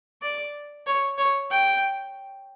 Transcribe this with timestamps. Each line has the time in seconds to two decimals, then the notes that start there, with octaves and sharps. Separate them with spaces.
0.22 D5
0.86 C#5
1.18 C#5
1.50 G5